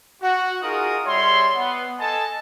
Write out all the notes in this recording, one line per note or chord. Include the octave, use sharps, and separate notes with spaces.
F#4
D#4 F4 F#4 G#4 A#4 D#6
G3 C#5 E5 C6
B3
A4 D#5 G#5 A5